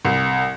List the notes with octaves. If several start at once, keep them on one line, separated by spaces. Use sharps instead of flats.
C2